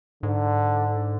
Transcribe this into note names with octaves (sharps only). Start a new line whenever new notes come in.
G#2 D3